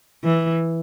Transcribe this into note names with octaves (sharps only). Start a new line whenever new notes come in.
E3